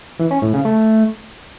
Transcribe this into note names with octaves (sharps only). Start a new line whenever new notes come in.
E3
C#4
A2
C#3
A3